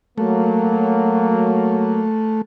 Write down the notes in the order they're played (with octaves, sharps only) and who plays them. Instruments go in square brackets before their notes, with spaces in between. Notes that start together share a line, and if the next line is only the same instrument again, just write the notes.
[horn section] F#3 A#3 [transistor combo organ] A3